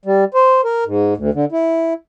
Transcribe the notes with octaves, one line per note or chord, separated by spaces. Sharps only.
G3
C5
A#4
G#2
D2
D3
E4